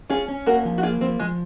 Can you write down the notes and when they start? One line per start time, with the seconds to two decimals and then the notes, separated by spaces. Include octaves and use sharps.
0.10 C#4 F4 G#4
0.28 C#4
0.46 A#3 F#4 A#4
0.65 F3
0.78 F#4
0.83 A#3 F4 G#4
1.01 F3 C4
1.20 F3 G#3